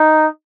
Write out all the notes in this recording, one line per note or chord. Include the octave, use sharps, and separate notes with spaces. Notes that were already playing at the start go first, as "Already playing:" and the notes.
Already playing: D#4